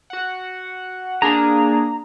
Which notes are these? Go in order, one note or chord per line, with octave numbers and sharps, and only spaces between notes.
F#4 F#5
A#3 D4 G#4 A#5